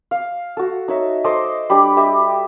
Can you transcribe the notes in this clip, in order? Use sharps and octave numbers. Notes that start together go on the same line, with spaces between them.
F5
F#4 A4
D#4 C#5 E5
A4 C5 D#5 D6
G3 D4 G4 B5
G4 D#5 E5